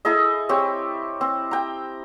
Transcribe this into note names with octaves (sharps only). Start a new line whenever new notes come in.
E4 G#4 A4 D#5
C4 G4 C#5 G5
C4
G5 A#5